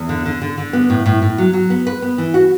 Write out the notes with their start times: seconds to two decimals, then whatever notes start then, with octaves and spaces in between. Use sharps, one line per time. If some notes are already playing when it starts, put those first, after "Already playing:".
Already playing: E2
0.09 D3
0.26 D3
0.42 D3
0.58 D3
0.73 B3
0.90 A2
1.06 A2
1.22 A2
1.38 F#3
1.53 F#3
1.70 B3
1.87 B4
2.02 B3
2.18 E3
2.34 F#4